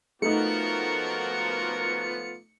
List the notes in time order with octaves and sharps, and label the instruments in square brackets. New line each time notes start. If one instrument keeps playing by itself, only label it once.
[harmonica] F3 B3 F4 [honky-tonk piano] A3 D#4 [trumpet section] F#4 A#4 [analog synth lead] C#7